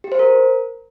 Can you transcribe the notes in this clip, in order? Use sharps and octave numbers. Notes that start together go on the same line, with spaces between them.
G4
C5
A#4